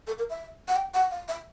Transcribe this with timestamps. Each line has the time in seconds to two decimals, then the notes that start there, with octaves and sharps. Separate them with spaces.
0.07 A4
0.18 A#4
0.30 E5
0.68 F#5
0.76 G5
0.94 F#5
1.11 F5
1.28 E5